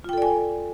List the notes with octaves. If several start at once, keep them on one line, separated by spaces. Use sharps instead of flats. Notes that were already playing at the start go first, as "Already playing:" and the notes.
F4 A4 D5 G5 G#5